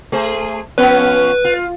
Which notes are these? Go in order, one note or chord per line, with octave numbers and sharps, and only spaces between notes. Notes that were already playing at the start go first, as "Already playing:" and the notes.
A3 G#4 C5
F3 B3 C#4 B4
F4